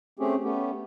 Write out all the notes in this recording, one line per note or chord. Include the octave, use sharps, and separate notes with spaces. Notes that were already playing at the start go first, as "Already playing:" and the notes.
A3 C4 C#4 G4 G#4
A3 B3 C#4 G4